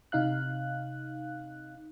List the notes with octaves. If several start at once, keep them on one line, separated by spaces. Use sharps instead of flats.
C3 D#4 F5 F#6